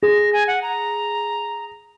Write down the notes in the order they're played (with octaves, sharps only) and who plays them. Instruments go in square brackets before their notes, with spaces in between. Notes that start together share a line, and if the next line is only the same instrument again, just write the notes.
[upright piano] G#4 [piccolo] A#6
[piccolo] G#5
F#5
A#5